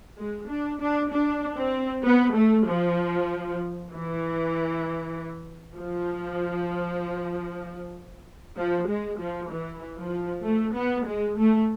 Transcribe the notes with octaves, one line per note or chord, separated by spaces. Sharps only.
G#3
D4
D4
D4
C4
B3
A3
F3
E3
F3
F3
G#3
F3
E3
F3
A3
B3
G#3
A3